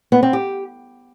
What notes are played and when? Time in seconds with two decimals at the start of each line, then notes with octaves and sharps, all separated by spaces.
0.12 B3
0.23 C4
0.33 G4